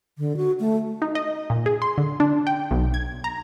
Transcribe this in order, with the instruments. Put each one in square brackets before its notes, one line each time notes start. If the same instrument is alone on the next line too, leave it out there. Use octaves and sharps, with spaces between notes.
[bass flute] D3
F#4
A3
[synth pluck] D#4
D#5
A#2
G#4
C6
D3
D4
G5
B1
G#6
A#5